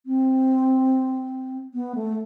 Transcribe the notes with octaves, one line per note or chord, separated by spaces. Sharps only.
C4
B3
A3